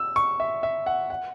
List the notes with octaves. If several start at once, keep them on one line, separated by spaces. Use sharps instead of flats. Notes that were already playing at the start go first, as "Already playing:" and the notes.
Already playing: E6
C#6
E5
E5
F#5
F#5